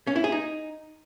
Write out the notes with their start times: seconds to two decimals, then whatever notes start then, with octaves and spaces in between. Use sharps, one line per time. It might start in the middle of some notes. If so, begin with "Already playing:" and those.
0.07 C#4
0.16 E4
0.24 G#4
0.32 D#4